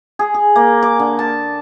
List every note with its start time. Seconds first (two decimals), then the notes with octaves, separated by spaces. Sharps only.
0.19 G#4
0.34 G#4
0.56 A#3
0.83 D6
0.99 D3
1.19 A5